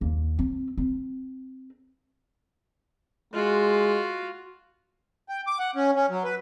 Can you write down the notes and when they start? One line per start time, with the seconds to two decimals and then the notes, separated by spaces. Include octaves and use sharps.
0.01 D#2
0.39 C4
0.78 C4
3.34 G#3 F4 F#4
5.29 G5
5.47 D6
5.59 F#5
5.75 C#4
5.96 C#4
6.09 F#3
6.24 B4